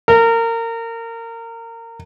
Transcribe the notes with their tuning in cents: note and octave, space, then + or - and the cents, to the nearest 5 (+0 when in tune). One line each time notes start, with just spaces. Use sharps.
A#4 -25